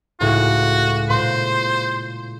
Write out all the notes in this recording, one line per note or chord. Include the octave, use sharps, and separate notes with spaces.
C#2 A2 F#4
A#2 C5 C6